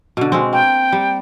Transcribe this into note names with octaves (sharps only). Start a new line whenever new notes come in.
B2 D3
B2 G#3 C4
A#3 G5
G3